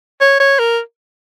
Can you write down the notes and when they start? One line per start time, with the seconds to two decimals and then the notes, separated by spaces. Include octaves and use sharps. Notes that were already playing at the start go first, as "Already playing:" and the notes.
0.21 C#5
0.40 C#5
0.59 A#4